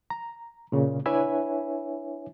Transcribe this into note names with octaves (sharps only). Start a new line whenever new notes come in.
A#5
A#2 C#3
D4 E4 B4 C#5 E5 G#5